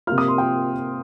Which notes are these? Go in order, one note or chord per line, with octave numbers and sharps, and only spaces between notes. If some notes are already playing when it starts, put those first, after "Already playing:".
C3 F3 A#3 F4 F6
D#6
C6
G5